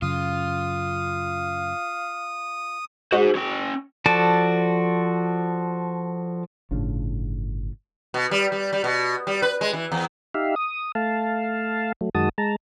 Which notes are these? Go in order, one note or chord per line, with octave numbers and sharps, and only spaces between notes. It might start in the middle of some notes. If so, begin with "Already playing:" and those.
F#2 C#3 F4 F5 D#6
G#3 F#4 G#4 C5
C#4 G5
F3 F#4 A4 D5 A5
G1 A2 C#3 F3 D4
B2
G3
G3
G3
B2
G3
B4
G#3
E3
E2
D#4 G4 E5 F5
D#6
A3 F5 A5
F#3 A3
F#2 D#3 G#3 F#4 A5 D#6
G#3 A5 A#5